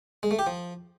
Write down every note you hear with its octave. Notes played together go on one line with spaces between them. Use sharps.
G#3
A3
G4
F3